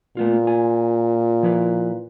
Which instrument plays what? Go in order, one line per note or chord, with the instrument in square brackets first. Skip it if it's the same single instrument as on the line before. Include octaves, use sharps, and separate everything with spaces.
[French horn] A#2 [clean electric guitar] A3 B3 F4
[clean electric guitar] F4 G#5
F3 E4 B4